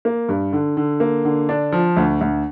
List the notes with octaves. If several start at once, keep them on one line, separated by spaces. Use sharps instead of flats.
A#3
G2
D3
D3
A#3
D3
D4
F3
D2
D2